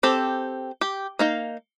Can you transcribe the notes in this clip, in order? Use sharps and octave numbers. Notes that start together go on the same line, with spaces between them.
C4 G4 A4
G4
A#3 D#4 F5